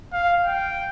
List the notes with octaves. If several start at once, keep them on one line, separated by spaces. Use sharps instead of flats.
F5
G5